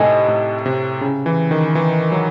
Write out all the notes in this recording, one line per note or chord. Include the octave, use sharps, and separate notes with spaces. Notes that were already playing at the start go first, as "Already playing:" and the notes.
Already playing: A2 C3 D#4 A4 D#5 G#5
A2
C3
C#3
E3
D#3
E3
F#3